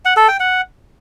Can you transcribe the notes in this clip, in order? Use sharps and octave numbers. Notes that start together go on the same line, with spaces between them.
F#5
A4
G5
F#5